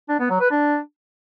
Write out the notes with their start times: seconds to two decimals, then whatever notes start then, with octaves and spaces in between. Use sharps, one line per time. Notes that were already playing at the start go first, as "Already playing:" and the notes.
0.09 D4
0.19 B3
0.30 F#3
0.40 B4
0.51 D4